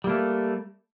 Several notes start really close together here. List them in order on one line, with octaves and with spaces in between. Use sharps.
G3 A#3 A3